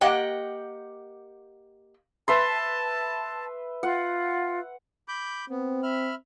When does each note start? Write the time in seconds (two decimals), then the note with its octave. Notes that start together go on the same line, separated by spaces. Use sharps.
0.01 A#3 G4 D#5 F#5 G5
2.28 B4 E5 A5 C6
3.83 F4 F#5
5.08 B5 D6 G6
5.50 B3 C4
5.83 E5 B5 F6